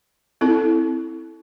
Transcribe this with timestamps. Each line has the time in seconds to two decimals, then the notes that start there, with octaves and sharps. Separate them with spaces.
0.41 C4 E4 A4